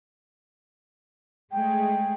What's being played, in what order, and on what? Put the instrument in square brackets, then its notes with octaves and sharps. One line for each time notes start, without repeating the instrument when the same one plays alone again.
[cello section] G#3 A3 G#4 [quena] G5